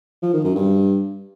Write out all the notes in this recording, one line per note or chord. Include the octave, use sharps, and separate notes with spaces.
F3
D#3
F#2
G2